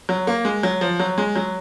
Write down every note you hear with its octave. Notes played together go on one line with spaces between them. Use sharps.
F#3
A#3
G#3
F#3
F3
F#3
G#3
F#3